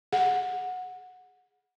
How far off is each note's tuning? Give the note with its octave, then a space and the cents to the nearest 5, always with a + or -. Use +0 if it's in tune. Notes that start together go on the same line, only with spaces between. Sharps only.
G#4 +0 F#5 -15